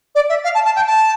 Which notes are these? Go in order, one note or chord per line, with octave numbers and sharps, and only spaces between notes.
D5
E5
F5
A5
A5
G5
A5